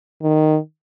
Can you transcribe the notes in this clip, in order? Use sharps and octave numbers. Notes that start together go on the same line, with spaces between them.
D#3